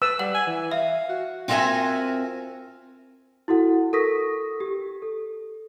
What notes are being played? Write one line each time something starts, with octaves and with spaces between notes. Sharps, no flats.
B4 E6
G3 F#5 F#7
G#5
E3
E5 F5
F#4
C4 F4 F#4 A#4 E5 G#5
E4 F#4 A4 F#5
A4 A#4 C#6 D#6 A#6 B6
G4
A4